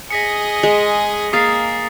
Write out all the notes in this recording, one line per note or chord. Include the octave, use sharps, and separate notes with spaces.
G#4 D#5 A#6 B6 C#7
G#3
A#3 G#4 F5 D#6 A6 C7